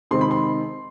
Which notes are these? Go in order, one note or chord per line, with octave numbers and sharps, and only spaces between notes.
C3 D#3 G#3 C4 C6
B5
C6